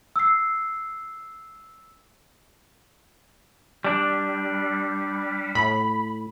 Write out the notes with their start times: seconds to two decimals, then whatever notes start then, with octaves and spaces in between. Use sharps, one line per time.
0.16 E6 C7
3.84 G3 D4
5.55 A2 B5